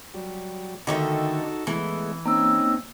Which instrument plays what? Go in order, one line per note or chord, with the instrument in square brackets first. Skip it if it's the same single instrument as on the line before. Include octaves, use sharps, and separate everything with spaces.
[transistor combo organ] F#3 G3
[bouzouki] D3 D#3 A3 [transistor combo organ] D#4 F#4 A4
[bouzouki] E3 [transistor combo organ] G#3 A3 B3
[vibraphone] A#3 E6 [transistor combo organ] C4 C#4 D#4